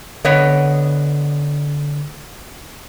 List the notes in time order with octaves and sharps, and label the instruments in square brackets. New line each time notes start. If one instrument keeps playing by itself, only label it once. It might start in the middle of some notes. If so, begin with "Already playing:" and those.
[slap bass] D3 [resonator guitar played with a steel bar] B3 C#5 D#5